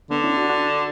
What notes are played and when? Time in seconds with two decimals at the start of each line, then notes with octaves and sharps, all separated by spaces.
0.10 D3 B3 D4
0.24 C#4 E4
0.37 D4 F#4
0.50 D4 F#4